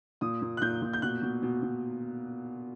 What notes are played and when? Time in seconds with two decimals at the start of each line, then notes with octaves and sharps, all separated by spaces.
0.21 A#2 D#6
0.42 A#2
0.57 F#6
0.62 A#2 G6
0.82 A#2
0.93 G6
1.02 B2 F#6
1.22 B2
1.43 B2
1.63 B2